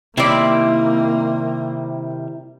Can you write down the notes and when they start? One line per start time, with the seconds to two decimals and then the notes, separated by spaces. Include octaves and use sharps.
0.17 C3 D#3 G3 A#3 C4 E4 D5